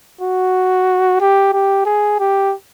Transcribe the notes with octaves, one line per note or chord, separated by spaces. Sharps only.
F#4
G4
G4
G#4
G4